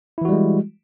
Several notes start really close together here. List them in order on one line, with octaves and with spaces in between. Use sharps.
E4 E3 F#4 G3 G#3